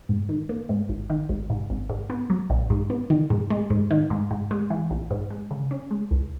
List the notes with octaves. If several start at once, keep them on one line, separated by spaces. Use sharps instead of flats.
G#2
D#3
A#3
G#2
G#1
D#3
G#1
G#2
G#1
G#2
B3
F#3
A#1
G#2
B3
D#3
G#2
G#3
G#2
D#3
G#2
G#2
G#3
E3
A#1
G#2
G#3
C#3
C#4
G#3
C#2